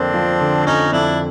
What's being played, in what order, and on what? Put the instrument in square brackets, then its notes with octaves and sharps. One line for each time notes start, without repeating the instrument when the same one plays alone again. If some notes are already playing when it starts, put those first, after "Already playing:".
Already playing: [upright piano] F2 D3 F3 A#3 [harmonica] C4 D4
[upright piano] F3
D3
[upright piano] F2 [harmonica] C#4 D#4
[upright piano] F2 [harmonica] D4 E4